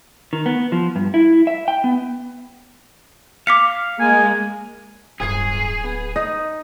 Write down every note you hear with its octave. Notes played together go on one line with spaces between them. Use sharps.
D#3
B3
F3
G2
E4
E5
G5
B3
F5 D6 B6 C#7
G#3 A#3 G#5
D1 G1 G#4 G#6 C7
B3
D#4 D#6 A#6